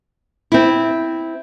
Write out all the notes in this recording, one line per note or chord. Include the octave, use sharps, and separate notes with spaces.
C4 E4